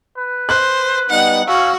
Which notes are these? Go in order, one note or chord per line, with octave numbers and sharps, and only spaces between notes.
B4
C5 F#6
G3 B3 D#4 F#5
C#4 F#4 F5 C#6 E6